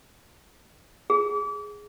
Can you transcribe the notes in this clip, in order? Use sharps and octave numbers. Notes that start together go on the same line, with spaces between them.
G#4